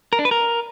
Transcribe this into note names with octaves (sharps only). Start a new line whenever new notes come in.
A#4
D4
B4
A#4